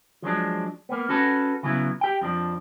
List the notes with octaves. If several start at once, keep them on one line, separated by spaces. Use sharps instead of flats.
F3 F#3 G#3 D4
A#3 B3
C#4 F#4 A4 B4
C#3 F#3 B3 E4
G4 G5
F2 F3 D4